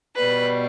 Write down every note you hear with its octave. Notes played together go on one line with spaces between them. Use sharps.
B2 G3 B4